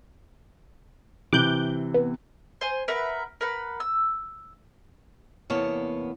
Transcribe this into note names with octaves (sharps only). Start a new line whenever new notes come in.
C3 E3 D6 F#6 G6
B3
C5 G#5
A#4 B4 E5 F#5
A#4 B4 F#5
E6
E2 C3 A#3 B3 C#5 A5